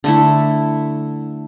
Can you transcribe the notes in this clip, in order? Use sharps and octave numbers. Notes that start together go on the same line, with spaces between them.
D3 A3 E4